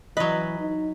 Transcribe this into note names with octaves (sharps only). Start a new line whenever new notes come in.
E3 F#3 B4 D#5
D#4